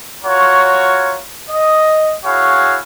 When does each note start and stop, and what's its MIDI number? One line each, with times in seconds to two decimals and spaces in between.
0.24 1.20 65
0.24 1.20 66
0.24 1.20 70
0.24 1.20 73
1.50 2.14 75
2.25 2.80 64
2.25 2.80 66
2.25 2.80 68
2.25 2.80 73
2.25 2.80 77